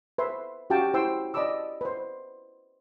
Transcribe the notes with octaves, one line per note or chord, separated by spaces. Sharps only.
B4 C5 E5 C6
C#4 F#4 G4 F5 G5 A5
E4 C5 G5 C6 E6
D5 D#5 A5 B5 D6 E6
B4 C5